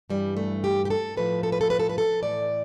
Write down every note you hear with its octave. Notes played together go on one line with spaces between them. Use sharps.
G2 E3 G3
A3
G4
G4
A4
A2 F3 B4
A4
B4
A4
B4
A4
B4
A4
A2 E3 D5